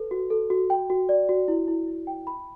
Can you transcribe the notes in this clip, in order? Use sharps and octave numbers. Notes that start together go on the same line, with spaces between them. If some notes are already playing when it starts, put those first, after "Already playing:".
Already playing: A4 B4
F#4
A4
F#4
G5
F#4
D5
F#4
E4
E4
E4
G5
B5